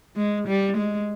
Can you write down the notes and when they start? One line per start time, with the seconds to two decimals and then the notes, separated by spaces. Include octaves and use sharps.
0.17 G#3
0.47 G3
0.77 G#3